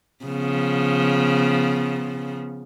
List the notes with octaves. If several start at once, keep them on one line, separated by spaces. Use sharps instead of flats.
C#3 F3 B3